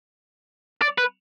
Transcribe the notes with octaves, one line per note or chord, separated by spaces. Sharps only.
D5
B4